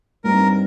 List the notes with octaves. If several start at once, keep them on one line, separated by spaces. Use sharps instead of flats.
G2 G3 C4 D#4 A#4